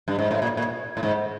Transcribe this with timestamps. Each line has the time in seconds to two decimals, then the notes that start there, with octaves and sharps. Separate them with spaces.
0.08 G2
0.19 G#2
0.31 A2
0.42 A#2
0.57 A#2
0.97 A2
1.03 G#2